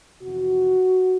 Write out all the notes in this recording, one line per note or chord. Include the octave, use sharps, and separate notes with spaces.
F2 C3 E3 F#4